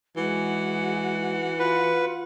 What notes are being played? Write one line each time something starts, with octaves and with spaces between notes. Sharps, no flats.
E3 G#3 F#4 F#5
F4 B4